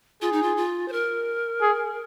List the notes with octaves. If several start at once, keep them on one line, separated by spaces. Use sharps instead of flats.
F4 G#4
D#4
F4
F4
C5
A#4
G#4